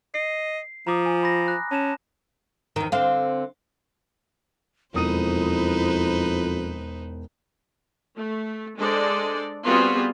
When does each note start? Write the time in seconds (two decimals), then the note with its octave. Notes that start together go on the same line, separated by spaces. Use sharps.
0.14 D#5 C7
0.87 F3 A#5 D6 D#6
1.06 G#5
1.23 B5 A#6
1.48 F#6
1.71 C#4 A5 E7
2.76 E2 D#3
2.92 D3 C4 F5
4.94 E1 F2 D#4 E4 B4 C5 D#6 D#7
8.16 A3
8.77 G#3 D4 A4 C5 D5
9.65 G3 B3 C4 F4 F#4 G#4